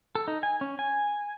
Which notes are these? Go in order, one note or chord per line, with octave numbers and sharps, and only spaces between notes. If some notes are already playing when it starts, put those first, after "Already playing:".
A4
D#4
G#5
C#4
G#5